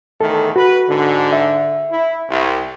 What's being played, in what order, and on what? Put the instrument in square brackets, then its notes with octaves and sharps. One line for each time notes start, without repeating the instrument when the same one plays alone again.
[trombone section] E2 D#3 A3 [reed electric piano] A4
[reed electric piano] F#4 [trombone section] B4
[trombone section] G#2 D3
[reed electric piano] E5
[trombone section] E4
C2